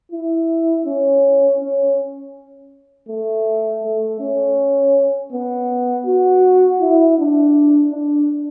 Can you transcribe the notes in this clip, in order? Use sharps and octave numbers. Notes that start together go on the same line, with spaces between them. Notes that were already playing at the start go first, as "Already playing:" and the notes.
E4
C#4
C#4
A3
A3
C#4
B3
F#4
E4
D4
D4